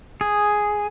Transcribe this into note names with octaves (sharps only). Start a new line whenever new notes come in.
G#4